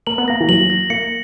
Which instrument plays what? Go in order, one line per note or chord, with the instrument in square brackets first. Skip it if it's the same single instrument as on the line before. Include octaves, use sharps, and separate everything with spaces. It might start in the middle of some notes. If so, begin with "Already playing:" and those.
[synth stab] A#3 [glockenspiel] F#7
[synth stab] B3
[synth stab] A#3 [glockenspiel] A#6
[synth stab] E3
[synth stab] F#3 [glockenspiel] F#7
[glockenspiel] A#6
[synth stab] A#3 [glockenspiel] C#7